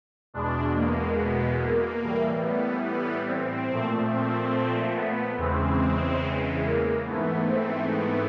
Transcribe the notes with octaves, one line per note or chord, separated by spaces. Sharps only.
E2 B2 G#3 D4
A#3
B3
A#3
A2 E3 G3
B3
B3
C4
A#2 F3 A3
C4
B3
E2 C#3 E3 G#3 C4
A#3
G#2 E3 A3 B3
C4
B3